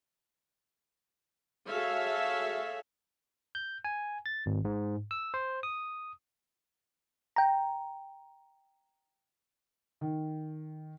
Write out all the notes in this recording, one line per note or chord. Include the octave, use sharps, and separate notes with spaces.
F#4 G#4 A4 C#5 E5 F5
G6
G#5
A6
G#1
G#2
E6
C5
D#6
G5 A#5
D#3